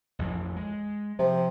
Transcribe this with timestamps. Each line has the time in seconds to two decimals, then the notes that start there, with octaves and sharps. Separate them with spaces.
0.19 A1 F2 E3
0.56 G#3
1.19 C3 F3